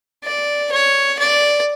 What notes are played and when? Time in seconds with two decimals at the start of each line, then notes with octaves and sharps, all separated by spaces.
0.24 D5
0.72 C#5
1.19 D5